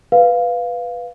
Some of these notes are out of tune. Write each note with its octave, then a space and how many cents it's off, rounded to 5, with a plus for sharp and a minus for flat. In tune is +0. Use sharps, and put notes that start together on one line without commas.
B4 +0 F5 +0